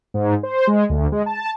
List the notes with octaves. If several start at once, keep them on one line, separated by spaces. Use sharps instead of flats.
G#2
C5
G#3
D2
G#3
A5